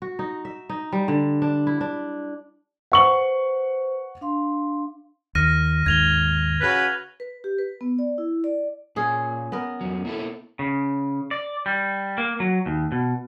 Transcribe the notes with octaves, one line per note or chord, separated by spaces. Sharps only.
F#4
D#4
E5
D#4
G3
D3
D4
E4
D4
B4 C5 F#5 C#6 F#7
D4 F5 C6
D#2 F6 A#6 D#7
D#2 G#2 G#6 F7 G7
C#3 F#4 B4
B4
G4
B4
B3
D5
E4
D5
A#2 C#4 G#4
B3 A#4
F2 F#3
A#3 E4 A4
C#3
D5
G3
A#3
F#3
D#2
B2